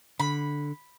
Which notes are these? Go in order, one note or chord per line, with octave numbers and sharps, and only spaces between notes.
D3 B5